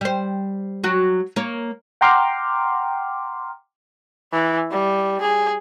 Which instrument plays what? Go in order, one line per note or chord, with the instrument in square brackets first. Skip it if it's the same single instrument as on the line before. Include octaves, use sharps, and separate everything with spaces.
[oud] G3 C5
F#3 F#4
A#3 C#5
[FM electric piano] F#5 G5 A#5 C6 D6 F6
[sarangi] E3
G3
G#4